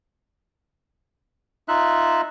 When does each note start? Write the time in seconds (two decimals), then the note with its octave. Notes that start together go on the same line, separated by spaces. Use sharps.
1.68 D#4 F4 E5 F#6